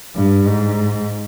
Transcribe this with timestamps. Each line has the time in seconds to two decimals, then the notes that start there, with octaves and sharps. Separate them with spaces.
0.15 G2
0.46 G#2